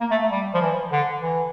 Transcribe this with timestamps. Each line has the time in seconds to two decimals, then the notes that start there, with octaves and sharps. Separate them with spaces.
0.01 A#3
0.11 A3
0.21 A3
0.31 G3
0.54 F3
0.61 E3
0.92 D3
1.22 E3